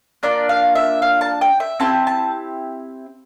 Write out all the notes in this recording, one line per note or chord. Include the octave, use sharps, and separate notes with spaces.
A#3 D4 F4 D5
F5
E5
F5
A5
G5
E5
C4 E4 G4 A5
A5